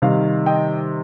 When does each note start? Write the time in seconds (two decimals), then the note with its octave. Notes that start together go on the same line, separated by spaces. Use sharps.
0.02 C3 D#3 G3 F5
0.46 D#5 G5